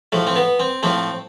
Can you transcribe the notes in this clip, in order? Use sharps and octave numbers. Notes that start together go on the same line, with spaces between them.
A2 F3 A3
C4
B3
C4
A2 F3 A3 C4